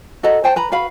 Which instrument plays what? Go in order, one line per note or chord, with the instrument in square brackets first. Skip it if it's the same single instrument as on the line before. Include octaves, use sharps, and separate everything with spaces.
[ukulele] F#4 A4 D#5 A#5
C5 G5 A5
B4 A#5 B5
F#4 B4 F5 B5